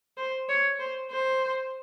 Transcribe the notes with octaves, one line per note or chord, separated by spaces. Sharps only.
C5
C#5
C5
C5